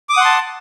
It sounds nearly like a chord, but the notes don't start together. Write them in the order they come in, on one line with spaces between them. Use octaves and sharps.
D6 D#6 F#5 C6 A5